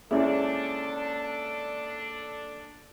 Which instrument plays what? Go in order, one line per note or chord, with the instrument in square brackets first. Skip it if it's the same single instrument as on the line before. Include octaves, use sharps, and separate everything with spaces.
[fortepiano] C#2 E4 [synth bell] A#3 D5 [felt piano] C#4 G#4 [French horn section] D4 A4